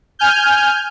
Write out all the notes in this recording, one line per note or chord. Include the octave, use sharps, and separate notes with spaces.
G#5 F6 G6